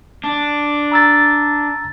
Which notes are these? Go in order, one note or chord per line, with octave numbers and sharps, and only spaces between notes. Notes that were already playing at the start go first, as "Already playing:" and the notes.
D4
A#5 E6 A6